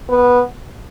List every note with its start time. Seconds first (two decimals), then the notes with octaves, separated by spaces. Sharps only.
0.10 B3